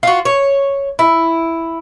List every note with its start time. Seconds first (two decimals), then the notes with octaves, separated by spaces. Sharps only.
0.03 F4 F#4
0.25 C#5
0.99 E4